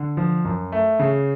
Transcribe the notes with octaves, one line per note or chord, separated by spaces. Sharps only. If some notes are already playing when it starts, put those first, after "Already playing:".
Already playing: D3
F3
F#2
A3
C#3